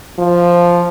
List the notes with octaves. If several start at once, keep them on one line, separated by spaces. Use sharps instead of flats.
F3